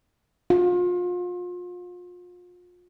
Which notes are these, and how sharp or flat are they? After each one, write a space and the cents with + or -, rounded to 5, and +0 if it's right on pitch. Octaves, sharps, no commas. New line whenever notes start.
F4 +35